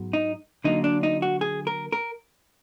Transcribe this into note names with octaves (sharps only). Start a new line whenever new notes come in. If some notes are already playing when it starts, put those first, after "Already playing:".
Already playing: G#2 F#3 B3
D#4
D3 F#3 A#3 D#4
D4
D#4
F#4
G#4
A#4
A#4